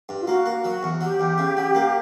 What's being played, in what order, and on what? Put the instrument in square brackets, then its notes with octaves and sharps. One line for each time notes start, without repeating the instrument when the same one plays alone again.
[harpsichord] G2
[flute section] F4
[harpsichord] A#3 [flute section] F#4
[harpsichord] A#3
[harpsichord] F#3 [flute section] F#4
[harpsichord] E2
[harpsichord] F#3 [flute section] G4
[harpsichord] E2
C#3
F#3
A#3